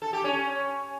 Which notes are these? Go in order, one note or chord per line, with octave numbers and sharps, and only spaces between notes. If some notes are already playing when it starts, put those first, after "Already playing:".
A4
G4
C#4